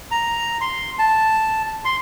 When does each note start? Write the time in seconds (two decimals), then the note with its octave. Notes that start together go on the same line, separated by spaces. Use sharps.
0.11 A#5
0.61 C6
0.99 A5
1.85 C6